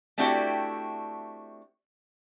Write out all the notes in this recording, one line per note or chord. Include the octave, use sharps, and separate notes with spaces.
A3 C4 D4 E4 F#4 G4